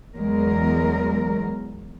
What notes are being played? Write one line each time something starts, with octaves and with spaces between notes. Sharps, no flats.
E2 F#3 G#3 A#4